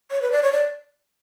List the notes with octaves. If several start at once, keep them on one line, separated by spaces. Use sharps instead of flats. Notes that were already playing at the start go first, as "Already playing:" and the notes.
C#5
B4
D5
C#5
D5